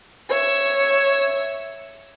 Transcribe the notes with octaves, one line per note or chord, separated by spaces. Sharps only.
C#5 E5